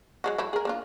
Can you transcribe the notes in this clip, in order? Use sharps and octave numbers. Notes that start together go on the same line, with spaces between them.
F#3 G#3 F#4
F#3 A3 E4
G#4 A#4
A#3 D4 F4